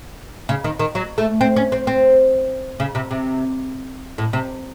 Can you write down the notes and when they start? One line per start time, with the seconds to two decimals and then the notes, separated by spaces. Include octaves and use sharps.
0.49 C#3
0.64 D#3
0.79 D#3
0.95 F#3
1.18 A3
1.41 C4
1.56 C#4
1.72 C4
1.87 C4
2.80 C#3
2.95 C3
3.11 C3
4.18 A2
4.33 C3